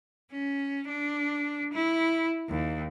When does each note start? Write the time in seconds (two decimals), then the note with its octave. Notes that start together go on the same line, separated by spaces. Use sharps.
0.32 C#4
0.89 D4
1.73 E4
2.49 D#2